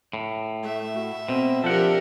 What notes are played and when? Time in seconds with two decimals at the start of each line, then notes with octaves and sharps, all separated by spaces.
0.13 A2
0.64 A3 E5
0.96 F#4
1.29 B2 C4
1.64 F3 D4 G4 A4 A#4 F#5